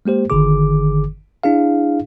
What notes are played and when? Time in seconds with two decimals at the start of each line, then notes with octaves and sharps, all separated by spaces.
0.06 G#3 A#3 G4 C5
0.30 G1 D3 D#3 G#4 D6
1.44 D4 E4 G#4 F5